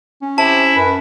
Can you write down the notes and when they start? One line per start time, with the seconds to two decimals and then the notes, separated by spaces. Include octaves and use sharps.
0.22 C#4
0.38 C3 E4 A5
0.76 F#2 B4